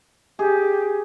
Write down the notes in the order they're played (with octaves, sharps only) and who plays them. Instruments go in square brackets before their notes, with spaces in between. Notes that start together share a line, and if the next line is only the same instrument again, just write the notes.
[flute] G4 [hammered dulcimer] G#4